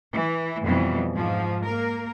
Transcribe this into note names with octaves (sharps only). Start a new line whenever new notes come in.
E3
F2 B2 E3 G3
G#2 F3
A#3 A#4